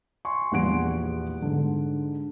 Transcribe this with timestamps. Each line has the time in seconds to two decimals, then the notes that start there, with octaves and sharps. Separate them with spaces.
0.25 G#5 C6 C#6
0.52 A#1 E2 G3 F#5 C6 D7
1.42 G#2 D3